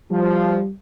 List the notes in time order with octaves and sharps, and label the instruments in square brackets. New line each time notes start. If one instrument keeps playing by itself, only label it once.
[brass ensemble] F3 [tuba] G3